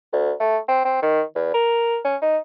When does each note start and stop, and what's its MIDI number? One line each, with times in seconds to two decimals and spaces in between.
0.13 0.32 38
0.40 0.58 57
0.68 0.80 60
0.85 0.99 60
1.02 1.22 51
1.35 1.50 40
1.54 1.98 70
2.05 2.16 61
2.22 2.37 63